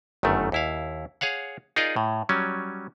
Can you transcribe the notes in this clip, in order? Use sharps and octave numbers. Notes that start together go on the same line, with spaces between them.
G1 F#2 D#3 A3
D#2 E4 F5
G#4 C#5 F5 F#5
D#4 F4 G#4 A#4 D5 D#5
A2
F#3 G3 C#4